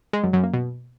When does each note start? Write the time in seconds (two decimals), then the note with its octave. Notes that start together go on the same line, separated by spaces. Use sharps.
0.13 G#3
0.23 F#2
0.33 F#2
0.43 A#3
0.53 B2